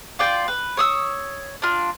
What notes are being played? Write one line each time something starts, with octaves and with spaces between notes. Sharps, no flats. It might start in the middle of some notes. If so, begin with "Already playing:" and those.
F4 D5 G5
B4
C#5 D#6 E6
D4 F4